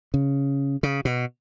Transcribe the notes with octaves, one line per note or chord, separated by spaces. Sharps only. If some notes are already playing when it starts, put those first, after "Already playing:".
C#3
C#3
B2